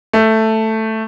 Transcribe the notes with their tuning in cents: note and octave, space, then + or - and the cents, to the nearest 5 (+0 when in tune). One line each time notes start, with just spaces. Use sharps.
A3 +5